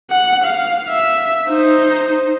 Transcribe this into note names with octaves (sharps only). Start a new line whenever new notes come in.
F#5
F5
E5
D#4 C5